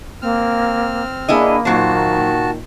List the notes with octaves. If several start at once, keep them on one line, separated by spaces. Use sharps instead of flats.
A#3 C4 F6
A#3 B3 D4 E4 G#4 D#5
A#2 D#3 F#3 F#4 C5 A5